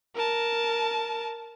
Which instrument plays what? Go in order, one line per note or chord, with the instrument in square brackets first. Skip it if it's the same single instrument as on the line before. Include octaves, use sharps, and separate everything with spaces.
[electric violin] A#4 A5